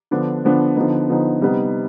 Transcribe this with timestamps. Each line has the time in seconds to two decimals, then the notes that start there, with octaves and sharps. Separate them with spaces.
0.11 D3 F3 B3 D4
0.44 D3 F3 B3 D4
0.76 D3 F3 B3 D#4
1.09 D3 F3 B3 D#4
1.41 C3 G3 B3 D#4